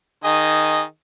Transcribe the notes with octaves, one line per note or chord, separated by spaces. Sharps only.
D#3 G#4 D#5